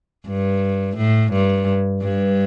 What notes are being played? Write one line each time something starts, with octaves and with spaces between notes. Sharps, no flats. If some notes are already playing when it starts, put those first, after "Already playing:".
G2
A2
G2
G2